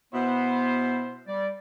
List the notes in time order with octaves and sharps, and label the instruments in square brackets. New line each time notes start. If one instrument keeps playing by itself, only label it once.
[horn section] B2 E4 C5 [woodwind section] B3
[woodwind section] G3 D5